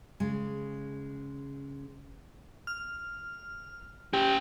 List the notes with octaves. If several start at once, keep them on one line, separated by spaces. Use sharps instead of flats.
C#3 G#3
F6
C#4 G4 G5